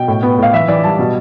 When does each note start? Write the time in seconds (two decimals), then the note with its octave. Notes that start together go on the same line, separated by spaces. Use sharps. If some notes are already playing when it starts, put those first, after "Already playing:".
Already playing: B2 G5
0.08 A2
0.23 B3
0.39 A2 F5
0.53 E3 E5
0.68 E3 D5
0.84 G3 A5
0.99 B2